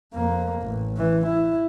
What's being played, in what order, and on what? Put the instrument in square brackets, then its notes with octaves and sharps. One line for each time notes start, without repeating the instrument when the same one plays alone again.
[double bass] F2 A#3
A1
E3
E4